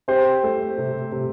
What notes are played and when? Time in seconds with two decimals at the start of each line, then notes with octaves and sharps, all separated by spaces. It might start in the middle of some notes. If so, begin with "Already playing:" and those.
0.08 C4 G4 C5
0.43 A3
0.78 C3
1.12 C3